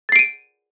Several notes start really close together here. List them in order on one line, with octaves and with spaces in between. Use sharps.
A6 C7 D7 D#7